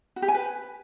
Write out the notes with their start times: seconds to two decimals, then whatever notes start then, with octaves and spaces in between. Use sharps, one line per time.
0.16 F#4
0.22 G4
0.28 G#5
0.34 B4